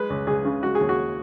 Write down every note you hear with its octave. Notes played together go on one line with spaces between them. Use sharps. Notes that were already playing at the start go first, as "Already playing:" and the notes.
Already playing: G#3 B4
C#2
C#2 G#4
C#3
G#3 F#4
G#4
D#2
F#4